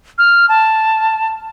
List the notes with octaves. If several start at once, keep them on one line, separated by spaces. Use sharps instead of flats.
F6
A5